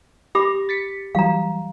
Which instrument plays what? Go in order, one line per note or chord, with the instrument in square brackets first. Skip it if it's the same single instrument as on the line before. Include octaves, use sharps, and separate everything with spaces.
[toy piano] G4 B5 D6 [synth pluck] A#6
[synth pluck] A6 B6 C#7
[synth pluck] E3 F#3 G3 [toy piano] F5 A#5